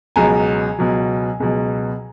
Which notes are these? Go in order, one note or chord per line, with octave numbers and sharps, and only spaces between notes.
C#2 B2 F#3 G#5 A#5
C#2 B2 F#3
C#2 B2 F#3